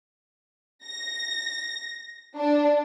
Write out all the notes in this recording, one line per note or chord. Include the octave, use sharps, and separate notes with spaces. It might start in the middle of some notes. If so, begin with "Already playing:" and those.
A#6
D4